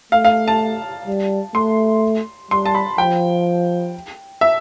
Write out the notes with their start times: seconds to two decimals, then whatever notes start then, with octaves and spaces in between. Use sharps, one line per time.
0.12 A3 F5
0.25 F5
0.48 A5
1.07 G3
1.55 A3 C6
2.51 G3 C6
2.66 A5
2.75 B5
2.98 F3 G5
4.41 E5